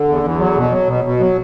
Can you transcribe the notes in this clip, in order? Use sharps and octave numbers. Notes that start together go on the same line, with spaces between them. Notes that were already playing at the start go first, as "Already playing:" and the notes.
Already playing: D3
E2
E2
F#3
B2
F#3
B2
B2
F#3